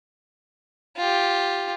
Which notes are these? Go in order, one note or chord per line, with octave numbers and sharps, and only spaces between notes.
F4 G4